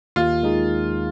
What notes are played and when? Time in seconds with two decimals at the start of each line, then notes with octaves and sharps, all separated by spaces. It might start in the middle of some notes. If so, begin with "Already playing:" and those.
0.16 D#2 F4
0.43 D#3 G#3 D#4 G#4